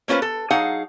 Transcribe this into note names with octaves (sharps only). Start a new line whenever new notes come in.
A#3 C#4 F4 B4 C5
A4
F#3 D#4 G#4 F5 F#5